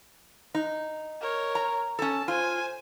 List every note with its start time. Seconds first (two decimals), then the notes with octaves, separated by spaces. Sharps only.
0.55 D#4
1.21 A#4 C#5
1.55 A#5
1.99 C#4 A4 A5
2.28 F4 C5 G#5